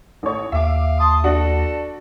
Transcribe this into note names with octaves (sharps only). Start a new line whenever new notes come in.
A1 C#5
D#2 E5 F5 D6
A5 C6 D#6
D4 F#4 A4